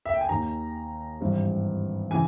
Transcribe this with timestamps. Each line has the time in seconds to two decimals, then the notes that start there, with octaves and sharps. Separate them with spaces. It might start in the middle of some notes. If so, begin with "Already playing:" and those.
0.06 E5
0.14 G5
0.21 G#5
0.29 D#2 D#3 A#5
1.21 G#1 G2 E3
2.11 C#3 E3 G#5